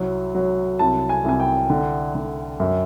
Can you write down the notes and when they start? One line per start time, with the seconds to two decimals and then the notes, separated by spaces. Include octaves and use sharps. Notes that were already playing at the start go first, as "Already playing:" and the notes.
Already playing: C2 F#3
0.35 F#3
0.79 C2 A5
1.09 G#5
1.24 C2 G#5
1.40 G5
1.70 D3
2.15 D3
2.60 F#2